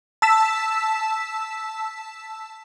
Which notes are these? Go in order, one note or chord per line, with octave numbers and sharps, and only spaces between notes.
A5 E6 B6 E7